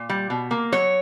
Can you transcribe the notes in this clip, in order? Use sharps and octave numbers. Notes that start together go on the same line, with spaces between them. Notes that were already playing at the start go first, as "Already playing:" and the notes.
Already playing: A#2
G3
B2
A#3
F#3 C#5